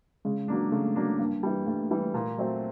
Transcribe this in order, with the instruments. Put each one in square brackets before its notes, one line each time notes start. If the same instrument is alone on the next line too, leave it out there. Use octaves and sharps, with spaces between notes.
[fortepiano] C#3 [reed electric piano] G#3
[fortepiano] F#3 A#3 D4
[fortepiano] C#3 [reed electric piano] A3
[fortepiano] F#3 A#3 D4
[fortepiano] G2 [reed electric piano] A#3
[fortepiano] E3 G3
[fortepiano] G2 [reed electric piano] A3
[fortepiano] E3 G3
A#2
F#3 A3 C4